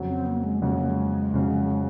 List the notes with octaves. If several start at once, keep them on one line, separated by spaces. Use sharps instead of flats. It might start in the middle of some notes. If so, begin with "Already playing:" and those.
Already playing: F2 C#3 F#3
C4
A#3
G#3
F2 C#3 F#3 G#3
A#3
G#3
F2 C#3 F#3